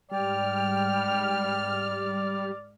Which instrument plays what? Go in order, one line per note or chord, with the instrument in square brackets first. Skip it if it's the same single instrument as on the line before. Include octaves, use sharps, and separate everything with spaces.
[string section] G#2 F6 [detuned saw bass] G3 [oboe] D5 [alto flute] G5